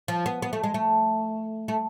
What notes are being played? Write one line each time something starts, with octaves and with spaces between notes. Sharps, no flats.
F3
B3
B3
A3
G#3
A3
A3